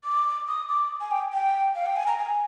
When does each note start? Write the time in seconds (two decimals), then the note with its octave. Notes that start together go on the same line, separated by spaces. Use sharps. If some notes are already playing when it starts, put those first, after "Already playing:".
0.04 D6
0.48 D#6
0.69 D6
1.00 G#5
1.11 G5
1.33 G5
1.75 F5
1.86 G5
1.96 G#5
2.07 A#5
2.18 G#5